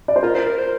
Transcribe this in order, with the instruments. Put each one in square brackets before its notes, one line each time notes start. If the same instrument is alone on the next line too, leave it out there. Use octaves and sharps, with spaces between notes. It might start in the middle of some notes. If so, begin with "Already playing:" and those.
[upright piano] D5
C5
[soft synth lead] F4 [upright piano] A#4
[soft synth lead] C5
A#4
C5